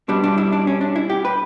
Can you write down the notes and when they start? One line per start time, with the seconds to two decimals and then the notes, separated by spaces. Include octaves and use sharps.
0.08 B2 G3 B3 D4
0.24 D4
0.38 E4
0.52 D4
0.67 C#4
0.81 D4
0.96 E4
1.10 G4
1.25 B4